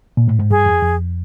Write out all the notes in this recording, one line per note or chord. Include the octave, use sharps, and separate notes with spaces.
A#2
A2
G#2
G2 G#4
F2
F2